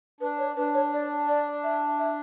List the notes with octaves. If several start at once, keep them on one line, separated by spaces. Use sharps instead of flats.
D4 B4
C#5
D4 B4
C#5
D5
D5
E5
E5